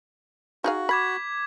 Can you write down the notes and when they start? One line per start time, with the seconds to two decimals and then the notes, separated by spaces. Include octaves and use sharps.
0.64 D#4 F#4 G#4 F5
0.89 B5 D6 G#6 B6